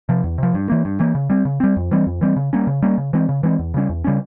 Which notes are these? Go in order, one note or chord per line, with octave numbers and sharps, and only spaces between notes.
C3 F3
E2
C3 F3
G2
E3 A#3
G2
E3 A#3
C#3
G3 C4
C#3
G3 C4
F2
E3 G3 C4
F2
E3 G3 C4
C#3
G3 A#3 C#4
C#3
G3 A#3 C#4
C#3
E3 G#3 C4
C#3
E3 G#3 C4
E2
C#3 G3 C#4
E2
C#3 G3 C#4